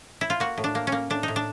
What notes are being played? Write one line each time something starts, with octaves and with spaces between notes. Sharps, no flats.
E4
F4
A#3 F#4
A2
D4
A#3
C#4
A#3
A2 D4
D#4
A2
D4